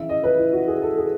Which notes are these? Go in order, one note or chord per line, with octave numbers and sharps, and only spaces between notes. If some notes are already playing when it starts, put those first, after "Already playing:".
Already playing: C#3 E3 E5
D#5
B4
E4
F#4
G#4
A4
G#4